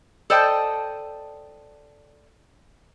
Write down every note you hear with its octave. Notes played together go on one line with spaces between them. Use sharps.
A4 C5 D5 D#5 G5 A5